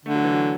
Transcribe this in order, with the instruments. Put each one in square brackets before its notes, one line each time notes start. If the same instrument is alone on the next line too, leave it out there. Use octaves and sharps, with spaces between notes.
[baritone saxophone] D3 [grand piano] A3
[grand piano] F#3
E3
F#3